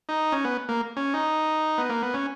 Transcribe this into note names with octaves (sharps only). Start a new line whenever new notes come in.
D#4
C#4
B3
A#3
C#4
D#4
B3
A#3
B3
C#4